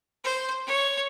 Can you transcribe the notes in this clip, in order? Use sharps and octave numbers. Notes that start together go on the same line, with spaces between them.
C5
C#5